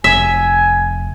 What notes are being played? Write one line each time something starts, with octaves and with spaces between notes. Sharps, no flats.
F1 E5 G#5